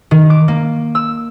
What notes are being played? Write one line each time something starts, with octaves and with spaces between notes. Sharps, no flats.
D#3
D6
A#3
E6